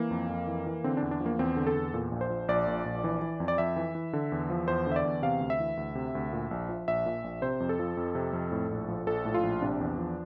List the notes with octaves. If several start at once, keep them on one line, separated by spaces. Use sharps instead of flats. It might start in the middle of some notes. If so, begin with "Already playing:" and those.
Already playing: E3 A#3
F2
F2
E3
E3
D3 C4
D4
E2
D4
F3
A#3
E2 C4
D3
A4
E2
A#2
A#1
C5
F3
A#1 D5
A#2
A#1
E3
E3
F2
D5
F2 E5
E3
E3
D3
E2
F3
E2 C5
D3 E5
D5
E2
C3 F5
D2
E5
E3
D2
C3
D2
A#2
A#1
F3
A#1 E5
A#2
A#1
C3 C5
F2
A4
F3
F2
C3
F2
A2
A#1
F3
A#1 A4
A2
F4
A#1
C3 D4
E2
F3